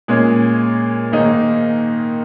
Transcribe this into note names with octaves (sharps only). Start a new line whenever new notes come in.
A#2 G#3 C#4 G#4
G#2 D#3 A#3 D#4 G#4